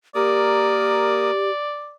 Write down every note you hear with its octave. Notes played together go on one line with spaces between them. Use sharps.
A#3 G4 A#4 D5 D#6